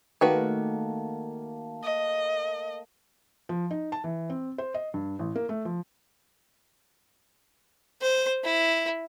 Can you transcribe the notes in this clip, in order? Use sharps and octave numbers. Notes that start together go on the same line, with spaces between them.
D#3 A3 A#3 F#4 B4
D#5
F3
D#4
A5
E3
C4
C5
D#5
G2
A1
A#3
A3
F3
C5
E4